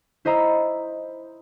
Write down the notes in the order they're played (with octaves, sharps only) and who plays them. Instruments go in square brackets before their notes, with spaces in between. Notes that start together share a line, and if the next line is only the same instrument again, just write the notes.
[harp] E4 C5 D#5 A#5 B5 E6